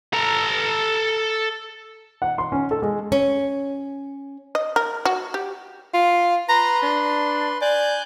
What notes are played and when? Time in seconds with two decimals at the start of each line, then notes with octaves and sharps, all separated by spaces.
0.13 A4 A#5
2.22 F#5
2.38 C6
2.52 C#4
2.71 A4
2.82 G#3
3.12 C#4
4.55 D#5
4.76 A#4
5.05 F#4
5.34 G4
5.94 F4
6.49 B4 A#5 C6
6.83 D4
7.62 D5 G#5 F#6 G6